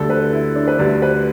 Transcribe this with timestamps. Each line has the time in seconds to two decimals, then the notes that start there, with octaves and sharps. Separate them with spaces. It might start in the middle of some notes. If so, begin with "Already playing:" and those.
Already playing: D2 D3 G3 A4
0.10 B4
0.33 E4
0.56 D4
0.68 B4
0.79 D2 D3 G3 D5
1.02 B4